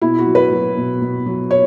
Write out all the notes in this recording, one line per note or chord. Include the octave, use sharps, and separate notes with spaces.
B2 E4
F#4
F#3
B4
F#3
B2
B2
F#3
C#5